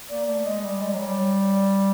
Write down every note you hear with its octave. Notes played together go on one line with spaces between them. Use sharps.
A#3 D5
A3 D5
G#3 D#5
G3
D5
G#3
F#3 C#5
G3
D5